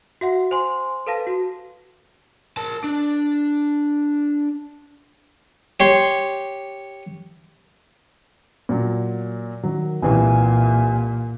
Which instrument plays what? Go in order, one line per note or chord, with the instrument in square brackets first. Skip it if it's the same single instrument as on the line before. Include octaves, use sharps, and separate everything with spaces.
[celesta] F#4 E5 F#5
C5 G#5 C6
A4 B4 F5 A5 A#6
F#4
[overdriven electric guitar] A#4 A5
D4
[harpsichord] G4 C#5 C6
[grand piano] A#2 F#3
[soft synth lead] D#3 [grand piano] F#3
[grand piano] C2 E3 [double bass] A#2 [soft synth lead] G#5